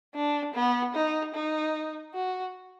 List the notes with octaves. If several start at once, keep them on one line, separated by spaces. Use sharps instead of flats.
D4
B3
D#4
D#4
F#4